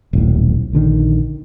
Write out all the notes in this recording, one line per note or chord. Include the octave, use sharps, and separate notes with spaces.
D#1 B1 A2
A#1 D3 D#3